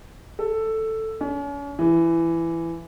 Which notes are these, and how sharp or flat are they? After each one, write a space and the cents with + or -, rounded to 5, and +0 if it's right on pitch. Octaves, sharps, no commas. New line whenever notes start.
A4 +5
C#4 +40
E3 +15